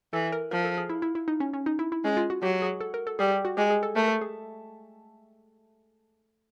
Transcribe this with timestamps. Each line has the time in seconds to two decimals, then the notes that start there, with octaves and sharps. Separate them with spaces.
0.13 E3 A4
0.32 A#4
0.51 F3 A#4
0.65 A4
0.77 G#4
0.90 E4
1.02 E4
1.15 E4
1.28 D#4
1.40 C#4
1.54 C#4
1.66 D#4
1.79 E4
1.92 E4
2.04 G#3 C#4
2.17 F4
2.30 F#4
2.43 F#3 G4
2.62 G#4
2.80 A4
2.94 A#4
3.07 A4
3.19 G3 G#4
3.32 G4
3.45 F#4
3.57 G#3 G4
3.70 G#4
3.83 A4
3.96 A3 A#4
4.08 A4
4.21 G#4